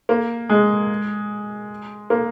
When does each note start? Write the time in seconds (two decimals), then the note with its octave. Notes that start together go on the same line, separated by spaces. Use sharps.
0.09 A#3
0.49 G#3
2.10 A#3